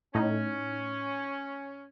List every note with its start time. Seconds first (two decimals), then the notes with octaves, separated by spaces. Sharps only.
0.15 A2 C#4 D#4